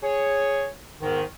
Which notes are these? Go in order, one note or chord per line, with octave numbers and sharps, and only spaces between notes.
G#4 C#5
E2 G#2 D#3